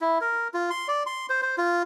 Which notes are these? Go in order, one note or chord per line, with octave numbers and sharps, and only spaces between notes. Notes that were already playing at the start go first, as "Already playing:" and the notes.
E4
A#4
F4
C6
D5
C6
C5
C5
F4